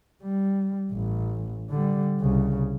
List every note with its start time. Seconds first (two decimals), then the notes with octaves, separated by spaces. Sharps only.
0.22 G3
0.92 A1
1.70 D3 G3
2.21 C2 C#3